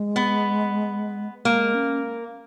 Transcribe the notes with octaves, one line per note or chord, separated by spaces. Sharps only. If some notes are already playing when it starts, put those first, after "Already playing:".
Already playing: G#3
B3
G#3 A#3
C#4